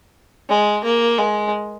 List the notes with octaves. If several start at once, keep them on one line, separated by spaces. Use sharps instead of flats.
G#3
A#3
G#3